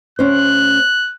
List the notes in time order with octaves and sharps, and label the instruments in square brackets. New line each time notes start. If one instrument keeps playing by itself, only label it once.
[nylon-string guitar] D2 C#4 C5 [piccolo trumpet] F#6